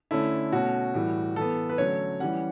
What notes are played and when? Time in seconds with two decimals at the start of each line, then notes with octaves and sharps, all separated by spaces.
0.11 D3 A3 C#4 E4
0.52 B2 A3 C#4 F#4
0.94 A2 E3 G3
1.36 E3 B3 A4
1.69 B4
1.78 D3 F#3 A3 C#4 C#5
2.20 E3 G3 C#4 F#5